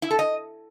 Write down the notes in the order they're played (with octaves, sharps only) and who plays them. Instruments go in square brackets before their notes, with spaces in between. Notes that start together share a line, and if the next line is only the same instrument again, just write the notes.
[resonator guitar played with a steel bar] E4
A4
D#5